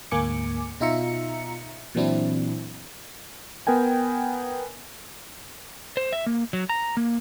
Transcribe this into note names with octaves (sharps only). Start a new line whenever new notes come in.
D2 G#2 A#3 G#5 D6 C#7
B2 D#4 F4 E5 A#5 C#7
A#2 E3 F#3 C4 D4 E4
B3 A#4 G5 G#5
C5
E5
A#3
F#3
A#5
A#3